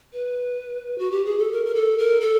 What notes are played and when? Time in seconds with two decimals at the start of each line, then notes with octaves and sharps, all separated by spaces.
0.13 B4
0.99 F#4
1.11 G4
1.25 G#4
1.39 A4
1.52 A#4
1.65 A#4
1.75 A4
1.98 A#4
2.21 A4